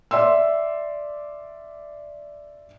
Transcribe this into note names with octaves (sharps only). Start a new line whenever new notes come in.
D5 E5 C6 E6